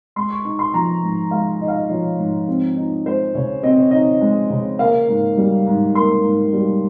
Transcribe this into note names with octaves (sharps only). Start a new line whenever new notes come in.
G#3 C6
C#6
D#4 C#6
C6
F3 A#5
G#2
G#3 F5
D#4 D#5
F5
D#5
F3 C#5
G#2
C4
D#4
G#3 C5
C#3 C#5
C4 D#5
C#5
D#4 D#5
G#3
C#3
A#3 F5
G#2
G3
G#2
A#3 C6
G#2
G3